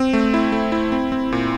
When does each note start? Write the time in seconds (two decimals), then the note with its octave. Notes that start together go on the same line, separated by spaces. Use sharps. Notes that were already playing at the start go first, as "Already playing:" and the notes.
Already playing: C4
0.13 A3
0.34 E4
0.52 A3
0.72 E4
0.92 C4
1.12 C4
1.32 A#2